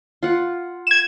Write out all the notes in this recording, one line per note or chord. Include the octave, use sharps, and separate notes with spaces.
F4 F#5
G#6 E7